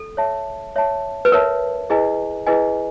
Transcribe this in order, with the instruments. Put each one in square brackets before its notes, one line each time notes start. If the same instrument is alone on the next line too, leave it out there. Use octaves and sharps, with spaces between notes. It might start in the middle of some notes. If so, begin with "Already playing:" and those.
Already playing: [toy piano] A4
[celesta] C#5 E5 A5
C#5 E5 A5
[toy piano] B4
[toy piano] A#4 [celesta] C#5 E5 A5
[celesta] E4 G#4 B4 D#5 G#5
E4 G#4 B4 D#5 G#5